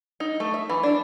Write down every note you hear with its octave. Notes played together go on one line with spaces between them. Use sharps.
D#4
A3
E5
E3
D4